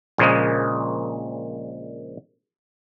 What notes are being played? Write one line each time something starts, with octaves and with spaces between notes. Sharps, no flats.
A#1 A#2 C#3 F3 G#3